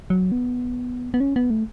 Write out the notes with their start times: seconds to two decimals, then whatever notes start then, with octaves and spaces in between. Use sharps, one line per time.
0.10 F#3
0.32 B3
1.14 B3
1.20 C#4
1.36 B3
1.50 A3